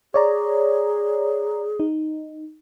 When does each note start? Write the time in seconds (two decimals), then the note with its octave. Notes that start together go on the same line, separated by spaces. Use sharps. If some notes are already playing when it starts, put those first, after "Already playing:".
0.14 G#4 C#5 D5 A#5
1.80 D#4